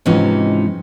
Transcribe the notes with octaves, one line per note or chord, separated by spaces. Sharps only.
G#2 C3 E3 F3 C#4 D#4